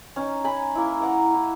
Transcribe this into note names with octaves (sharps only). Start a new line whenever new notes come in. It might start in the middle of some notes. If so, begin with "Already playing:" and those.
C#4 D#4
C#4 G#5 A#5 B5
A#3 E4
F#5 A#5 D6
E4